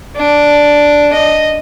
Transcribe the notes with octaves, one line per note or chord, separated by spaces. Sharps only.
D4
D#5